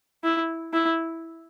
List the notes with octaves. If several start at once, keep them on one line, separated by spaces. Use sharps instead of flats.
E4
E4